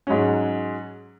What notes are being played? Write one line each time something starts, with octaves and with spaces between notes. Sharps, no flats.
G#2 F#3 C#4